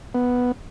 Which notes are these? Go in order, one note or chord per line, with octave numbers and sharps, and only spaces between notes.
B3